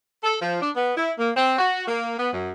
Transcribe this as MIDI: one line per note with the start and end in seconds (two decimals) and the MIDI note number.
0.24 0.35 69
0.42 0.59 53
0.62 0.71 62
0.75 0.93 59
0.97 1.12 64
1.19 1.31 58
1.37 1.55 60
1.58 1.85 66
1.88 2.13 58
2.18 2.30 59
2.33 2.52 42